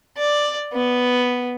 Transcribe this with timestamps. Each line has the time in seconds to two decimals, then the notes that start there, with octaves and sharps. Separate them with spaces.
0.18 D5
0.73 B3